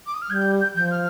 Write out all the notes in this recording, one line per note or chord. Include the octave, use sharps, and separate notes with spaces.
D6
D#6
F6
G3 G6 G#6
G6
F3 G6
F6